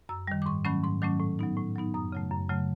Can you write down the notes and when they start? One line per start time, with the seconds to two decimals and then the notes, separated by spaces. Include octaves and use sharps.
0.09 F#2 E6
0.27 D#3 G3
0.42 D6
0.46 G#2 C#6
0.65 D#3 F#3 A3 C#4 B5
0.84 G#2 C6
1.01 D#3 F#3 A3 C#4 D6
1.20 A2
1.39 F#3 B3 D#4
1.57 A2
1.76 F#3 B3 D#4
1.94 F#2 D#6
2.12 C#3 F#3 A3
2.31 F#2
2.49 C#3 F#3 A3